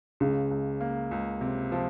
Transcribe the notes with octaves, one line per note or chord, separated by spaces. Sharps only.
C#2 C#3
C#2
A#3
C#2
C3
F3